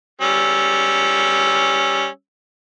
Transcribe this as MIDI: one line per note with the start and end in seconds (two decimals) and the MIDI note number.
0.21 2.07 55
0.21 2.07 61
0.21 2.07 88